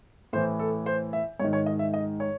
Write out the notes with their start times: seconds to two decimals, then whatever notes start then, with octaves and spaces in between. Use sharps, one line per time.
0.33 A2 E3 C5
0.59 A4
0.86 C5
1.13 E5
1.39 G#2 D#3 C#5
1.53 C#5
1.66 D#5
1.79 E5
1.94 D#5
2.20 C#5